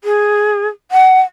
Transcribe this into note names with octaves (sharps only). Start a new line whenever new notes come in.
G#4
F#5